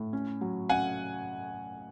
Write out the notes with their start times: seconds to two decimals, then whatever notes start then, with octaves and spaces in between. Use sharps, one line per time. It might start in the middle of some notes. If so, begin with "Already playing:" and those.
Already playing: A2
0.13 C#4
0.41 F#3
0.69 C#4 F#5 G#5